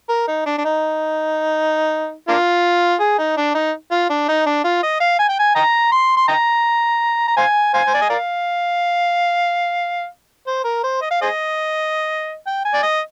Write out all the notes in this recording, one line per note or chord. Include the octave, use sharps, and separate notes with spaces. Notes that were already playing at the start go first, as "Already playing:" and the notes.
A#4
D#4
D4
D4
D#4
A#3 D4 F4
G#4
D#4
D4
D#4
F4
D4
D#4
D4
F4
D#5
F5
G#5
G5
G#5
D#5 G5 A#5
C6
C6
D#5 G5 A#5
A#5
C5 F5 G#5
C5 F5 G#5
C5
D5
D#5
A#4 D5 F5
C5
A#4
C5
D#5
F5
G#4 C5 D#5
G5
G#5
D5
D#5